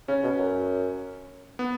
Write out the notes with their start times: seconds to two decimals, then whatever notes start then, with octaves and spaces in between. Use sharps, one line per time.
0.08 C#3 C#4
0.24 B2
0.39 F#2
1.59 B3